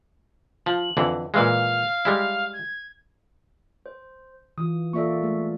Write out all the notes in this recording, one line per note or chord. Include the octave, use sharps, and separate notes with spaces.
F3 F#7
F2 D3 E3
A#2 E3 G#3 F5
G3 G#3 E4
G#6
C5
E3 F4 D#6
A#3 F4 A4 D5 E5 C#6
G#3 A3 G#4